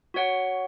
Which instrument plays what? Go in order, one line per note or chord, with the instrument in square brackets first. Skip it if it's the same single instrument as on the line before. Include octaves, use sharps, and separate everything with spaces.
[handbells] F#4 C#5 F#5